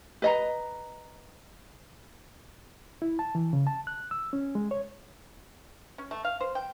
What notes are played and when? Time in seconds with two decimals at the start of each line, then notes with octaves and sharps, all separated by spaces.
0.22 B4 D#5 A#5
3.02 E4
3.19 A5
3.35 E3
3.53 C#3
3.67 A5
3.87 F#6
4.11 E6
4.33 C#4
4.55 G#3
4.71 C#5
5.98 C#4
6.11 A3
6.25 F5
6.41 C5
6.55 G5